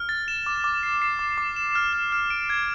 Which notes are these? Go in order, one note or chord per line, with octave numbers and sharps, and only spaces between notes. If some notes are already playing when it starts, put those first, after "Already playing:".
Already playing: F6
A6
E7
D6
D6
C7
C7
D6
D6
E7
F6
F6
F6
D7
G#6